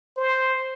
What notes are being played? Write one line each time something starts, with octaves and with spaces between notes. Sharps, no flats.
C5